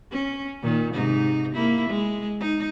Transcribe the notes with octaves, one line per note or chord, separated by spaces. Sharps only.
C#4
A#2 D#3
G#2 C3 D#4
A#3 E4
G#3
D#4